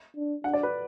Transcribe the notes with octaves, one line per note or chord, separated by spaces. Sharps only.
D4
D4 F#5
D5
B4